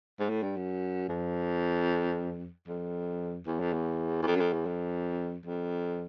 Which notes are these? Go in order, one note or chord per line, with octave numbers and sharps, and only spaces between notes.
G#2
A2
G2
F#2
F2
F2
E2
F2
E2
E2
F2
F#2
F2
E2
F2
F2